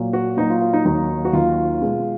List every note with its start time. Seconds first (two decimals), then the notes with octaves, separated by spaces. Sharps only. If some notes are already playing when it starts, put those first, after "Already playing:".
Already playing: A#2 F#3 A#3
0.13 F#4
0.37 A#2 F#3 A#3 D#4
0.50 F4
0.61 F4
0.73 D#4
0.85 D#2 D#3 F#3 A#3 D#4
1.25 F#4
1.33 D#2 D#3 F#3 A#3 F4
1.81 B2 G#3 B3